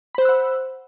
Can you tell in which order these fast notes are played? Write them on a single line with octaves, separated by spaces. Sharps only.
B5 C5 F#6 E6 F#5